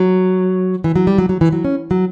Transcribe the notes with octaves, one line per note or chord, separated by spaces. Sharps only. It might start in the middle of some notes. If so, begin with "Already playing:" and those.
Already playing: F#3
E3
F#3
G3
F#3
F#3
E3
F#3
C#4
F#3